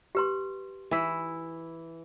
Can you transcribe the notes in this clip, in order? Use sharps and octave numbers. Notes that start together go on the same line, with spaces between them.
G4 B4 C6
E3 E4